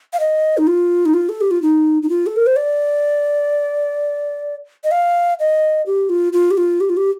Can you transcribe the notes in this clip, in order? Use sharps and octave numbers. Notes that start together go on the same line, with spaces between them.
F5
D#5
D#4
F4
D#4
F4
A4
G4
F4
D#4
D#4
F4
A4
A#4
C5
D5
D#5
F5
D#5
G4
F4
F4
G4
F4
G4
F4
G4